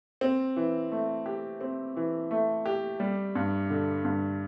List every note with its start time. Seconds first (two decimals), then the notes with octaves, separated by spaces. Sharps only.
0.21 C4
0.56 E3
0.92 A3
1.26 G4
1.61 C4
1.97 E3
2.31 A3
2.66 G4
3.00 G3
3.35 G2
3.70 D3
4.05 G2